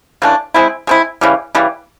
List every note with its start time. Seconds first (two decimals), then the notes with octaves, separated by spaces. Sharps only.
0.22 C#3 E3 A3 D4
0.54 G#3 C4 E4
0.87 G#3 C4 E4
1.21 C#3 E3 G3
1.55 C#3 E3 G3